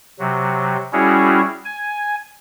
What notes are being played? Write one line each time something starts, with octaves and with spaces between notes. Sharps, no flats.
C3 F#3
G3 C#4 E4 F#4 G#4
G#5